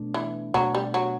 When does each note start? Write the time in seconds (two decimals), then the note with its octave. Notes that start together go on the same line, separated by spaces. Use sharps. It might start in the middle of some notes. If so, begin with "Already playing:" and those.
Already playing: B2 A3 D4
0.14 E3
0.54 B2 F#3 A3 D4
0.75 G3
0.94 F#3